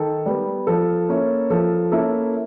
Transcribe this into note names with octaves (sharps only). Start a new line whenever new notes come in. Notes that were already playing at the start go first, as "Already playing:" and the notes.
Already playing: D#3 A4
G3 B3
F3 A4
A#3 C#4 E4
F3 A4
A#3 C#4 E4 A4